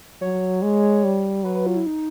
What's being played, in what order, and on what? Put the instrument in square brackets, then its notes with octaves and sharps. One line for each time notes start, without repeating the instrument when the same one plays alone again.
[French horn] F#3 [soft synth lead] C#5
[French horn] G#3
G3
[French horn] F#3 [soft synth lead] B4
[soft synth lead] B4
F4
E4
D#4